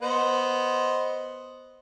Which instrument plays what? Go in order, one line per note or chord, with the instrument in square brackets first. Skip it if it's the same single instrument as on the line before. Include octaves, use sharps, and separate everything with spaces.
[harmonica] B3 C5 D#5